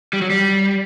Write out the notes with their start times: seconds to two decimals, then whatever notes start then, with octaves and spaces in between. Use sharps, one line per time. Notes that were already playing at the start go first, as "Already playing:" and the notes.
0.13 G3
0.22 F#3
0.30 G3